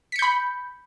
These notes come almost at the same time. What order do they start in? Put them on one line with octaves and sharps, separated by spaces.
B6 C#7 G6 B5